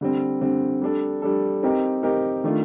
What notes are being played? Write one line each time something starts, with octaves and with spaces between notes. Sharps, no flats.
D3 G3 C4
D3 G3 C4
G3 D4 A4
G3 D4 A4
C4 D#4 G4 A#4
C4 D#4 G4 A#4
D#3 A3 D4 F4